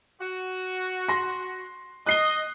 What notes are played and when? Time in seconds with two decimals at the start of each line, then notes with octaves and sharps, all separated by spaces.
0.21 F#4
1.08 C6 A#6
2.06 D#5 F#6 C7 G7